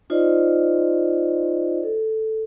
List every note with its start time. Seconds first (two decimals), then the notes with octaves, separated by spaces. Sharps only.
0.10 D#4 F4 C5 D5 D#5
1.83 A4